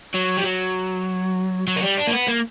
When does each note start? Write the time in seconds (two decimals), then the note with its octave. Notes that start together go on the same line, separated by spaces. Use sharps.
0.14 F#3
0.37 G3
0.44 F#3
1.67 F#3
1.76 A#3
1.82 G3
1.97 D4
2.07 A#3
2.13 B3
2.28 A#3